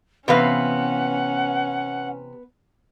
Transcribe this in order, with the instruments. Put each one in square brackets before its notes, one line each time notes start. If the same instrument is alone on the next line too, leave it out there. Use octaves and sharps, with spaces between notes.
[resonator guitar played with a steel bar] C3 E3 F5 [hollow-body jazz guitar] B3 B4 [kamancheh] C#4 [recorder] F#5